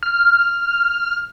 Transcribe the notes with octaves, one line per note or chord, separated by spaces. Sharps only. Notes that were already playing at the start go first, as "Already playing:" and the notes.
F6